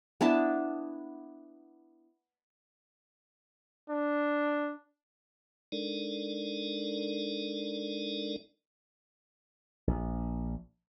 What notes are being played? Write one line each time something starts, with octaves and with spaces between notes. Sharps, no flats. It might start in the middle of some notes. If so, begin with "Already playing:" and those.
B3 D4 E4 A5
D4
G#3 D4 D#4 A4 A#4 D5
A#1